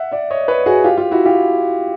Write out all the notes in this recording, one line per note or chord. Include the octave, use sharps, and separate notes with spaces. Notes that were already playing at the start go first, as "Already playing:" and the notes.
Already playing: E5 F#5
D5 E5
C#5 D#5
B4 C#5
F#4 G#4
F4 G4
F4
E4 F#4
F4 G4